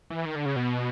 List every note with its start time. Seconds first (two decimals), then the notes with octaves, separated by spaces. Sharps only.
0.10 E3
0.25 D#3
0.35 D3
0.46 C#3
0.56 B2